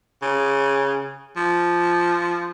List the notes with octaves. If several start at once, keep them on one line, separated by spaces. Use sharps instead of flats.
C#3
F3